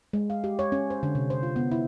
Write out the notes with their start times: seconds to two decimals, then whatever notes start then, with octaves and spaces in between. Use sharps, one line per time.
0.13 G#3
0.30 F5
0.44 G4
0.59 C#5
0.72 C#4
0.90 C5
1.03 D3
1.15 C3
1.30 C5
1.43 F4
1.56 B3
1.72 E4